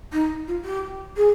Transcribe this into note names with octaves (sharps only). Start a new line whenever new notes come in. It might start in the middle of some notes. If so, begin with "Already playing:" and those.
D#4
F4
G4
G#4